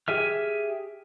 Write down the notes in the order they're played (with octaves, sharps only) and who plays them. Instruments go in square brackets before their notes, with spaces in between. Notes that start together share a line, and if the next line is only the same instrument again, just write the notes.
[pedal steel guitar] G4 G#4 E5 F6